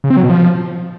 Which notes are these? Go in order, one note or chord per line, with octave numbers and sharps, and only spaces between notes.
C#3
C4
F#3
B2
F3